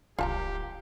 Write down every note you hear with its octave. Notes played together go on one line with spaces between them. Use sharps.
D1 C2 G3 F4 G4 A5 A#5